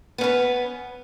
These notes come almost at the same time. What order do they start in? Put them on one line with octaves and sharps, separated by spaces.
B3 C#4 B4